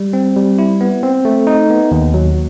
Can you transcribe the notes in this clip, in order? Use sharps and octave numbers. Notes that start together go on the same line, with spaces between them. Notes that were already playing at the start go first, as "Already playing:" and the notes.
Already playing: G3
C4
G3
E4
B3
C4
A3
D#4
B3
D#2
F#3